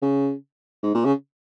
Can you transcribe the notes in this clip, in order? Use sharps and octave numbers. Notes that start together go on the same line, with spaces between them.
C#3
G#2
A#2
C#3